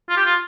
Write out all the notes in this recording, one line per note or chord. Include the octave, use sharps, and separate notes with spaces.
F4
G4
F4